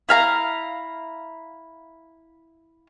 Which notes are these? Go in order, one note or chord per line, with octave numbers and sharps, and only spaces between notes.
E4 F5 A#5